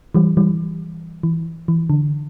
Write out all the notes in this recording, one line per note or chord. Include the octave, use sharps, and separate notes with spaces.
E3 G3
E3 G3
E3
E3
D3